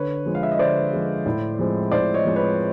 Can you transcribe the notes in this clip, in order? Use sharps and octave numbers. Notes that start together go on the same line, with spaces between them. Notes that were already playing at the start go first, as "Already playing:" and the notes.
Already playing: D3 B4 C#5
F3 G#3
F5
E5
D#5
D3 C5 D5
F3 G#3
A2
F3 G#3 C4
A2 C5 D5
C#5 D#5
F3 G#3 C4
B4 C#5